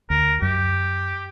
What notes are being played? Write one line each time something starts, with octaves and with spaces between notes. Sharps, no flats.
D2 A#4
F#2 G4